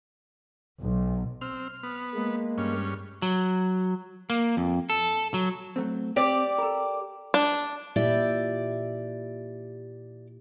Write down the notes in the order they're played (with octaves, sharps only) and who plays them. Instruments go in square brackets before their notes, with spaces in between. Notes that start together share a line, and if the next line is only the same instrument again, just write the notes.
[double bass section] B1
[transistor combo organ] C4 [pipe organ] F6
[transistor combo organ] B3
[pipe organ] G#3 A#3
[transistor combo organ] G2 C#4
[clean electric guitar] F#3
A#3
F2
A4
F#3
[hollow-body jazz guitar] F#3 A3 C4
[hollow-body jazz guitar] C4 [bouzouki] G4 D5
[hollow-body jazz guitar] A4 A#4
[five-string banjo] D4
[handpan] A#2 E4 [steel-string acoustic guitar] G4 D5 E5